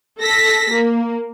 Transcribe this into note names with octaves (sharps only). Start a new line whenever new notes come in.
A4 A#6 B6
A#3